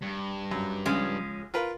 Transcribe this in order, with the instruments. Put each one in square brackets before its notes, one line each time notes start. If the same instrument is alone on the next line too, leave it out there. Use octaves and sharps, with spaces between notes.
[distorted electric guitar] G2
[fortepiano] F#2
[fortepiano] C#2 [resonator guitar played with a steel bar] F3 G#3 C#4
[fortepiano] F4 A#4 B4